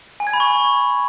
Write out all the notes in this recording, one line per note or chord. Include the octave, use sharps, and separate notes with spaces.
G#5
G#6
B5
C#6